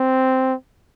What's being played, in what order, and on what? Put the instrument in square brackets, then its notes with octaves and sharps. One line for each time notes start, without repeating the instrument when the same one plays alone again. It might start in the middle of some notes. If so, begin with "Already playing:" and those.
Already playing: [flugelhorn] C4